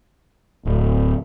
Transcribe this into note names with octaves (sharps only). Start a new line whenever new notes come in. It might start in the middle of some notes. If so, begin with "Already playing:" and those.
D1